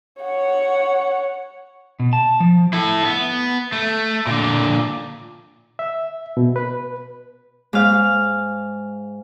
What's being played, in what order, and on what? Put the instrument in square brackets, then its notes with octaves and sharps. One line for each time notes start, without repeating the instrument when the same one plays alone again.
[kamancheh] C#5 F#5
[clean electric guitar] B2
A5
F3
[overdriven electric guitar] E4 A4
B3
A3
A#2 D3
[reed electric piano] E5
B2
B4
[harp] G#2 F5